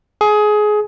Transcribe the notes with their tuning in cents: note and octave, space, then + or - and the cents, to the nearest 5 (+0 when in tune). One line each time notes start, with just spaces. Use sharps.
G#4 +20